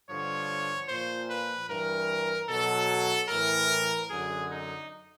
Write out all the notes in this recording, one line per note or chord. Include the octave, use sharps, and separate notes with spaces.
G2 D3 F3 C#5
A#2 F3 C5
B4
G2 E3 A#4
B2 F#3 A4
A2 E3 A#4
F#2 D3 F#3 G#4
D#4